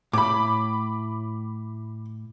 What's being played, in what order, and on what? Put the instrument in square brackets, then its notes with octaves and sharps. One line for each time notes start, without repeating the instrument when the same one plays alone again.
[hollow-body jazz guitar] A2 [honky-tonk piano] B5 D6